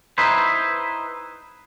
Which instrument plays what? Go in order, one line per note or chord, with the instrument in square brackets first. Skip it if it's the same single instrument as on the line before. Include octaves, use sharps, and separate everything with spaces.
[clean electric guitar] D#4 E4 B4 C5